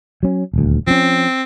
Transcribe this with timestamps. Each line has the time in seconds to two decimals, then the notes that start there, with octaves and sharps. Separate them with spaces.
0.23 F#3 C#4
0.54 D#1 D2
0.87 F3 C4 C#4